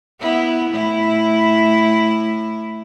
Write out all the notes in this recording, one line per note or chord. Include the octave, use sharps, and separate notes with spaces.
B3 E4
A2 E4